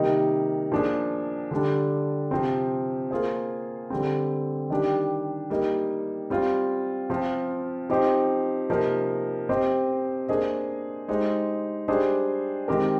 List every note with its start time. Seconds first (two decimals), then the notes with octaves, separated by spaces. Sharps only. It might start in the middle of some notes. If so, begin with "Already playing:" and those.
Already playing: C3 D#3 G3 A#3 D#4
0.72 F3 A#3 D4 G#4
1.51 D3 G3 D4
2.31 C3 F3 C4
3.11 A#3 F4 G#4 C5
3.90 D3 G3 C4
4.70 D#3 G3 D4 G4
5.50 G3 A#3 D#4
6.30 G3 C4 F4
7.10 F3 C4 F4
7.90 F3 C4 D#4 G4 C5
8.69 C3 F3 A#3 D#4 A#4
9.49 C4 G4 C5 D#5
10.28 A#3 D4 G#4 C5 D#5
11.08 G#3 D#4 G4 C5
11.88 G3 D4 G#4 C5 D#5
12.68 D#3 G#3 C4 G4 A#4